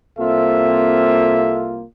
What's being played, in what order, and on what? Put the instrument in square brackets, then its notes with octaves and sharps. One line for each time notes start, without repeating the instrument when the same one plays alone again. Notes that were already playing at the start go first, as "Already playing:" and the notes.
[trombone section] C2 A#3 F4 [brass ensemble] C4 A4 E5